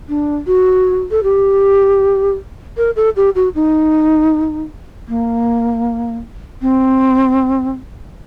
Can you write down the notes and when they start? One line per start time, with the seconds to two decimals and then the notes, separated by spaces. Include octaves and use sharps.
0.09 D4
0.47 F#4
1.11 A4
1.23 G4
2.77 A#4
2.96 A4
3.16 G4
3.35 F#4
3.55 D#4
5.08 A#3
6.62 C4